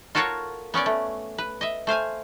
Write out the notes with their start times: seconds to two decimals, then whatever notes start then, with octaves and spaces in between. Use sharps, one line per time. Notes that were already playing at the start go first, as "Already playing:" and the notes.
0.15 F4 F#4 A4 A#4 C#5 F5
0.74 B3 C#4 C#5 D5
0.86 A3
1.38 B4
1.61 D#5 E5
1.87 A3 C5 F5 G#5